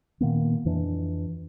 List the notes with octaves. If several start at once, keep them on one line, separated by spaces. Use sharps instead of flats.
A#2 D#3 A#3 B3
F2 E3 D4